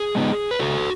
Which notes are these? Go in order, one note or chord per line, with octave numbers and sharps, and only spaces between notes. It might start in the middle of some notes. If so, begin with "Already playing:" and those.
Already playing: G#4
G#3 B3 D#4
B4
C#3 F#4 A4